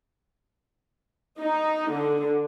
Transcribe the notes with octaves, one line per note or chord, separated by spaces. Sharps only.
D#4
D3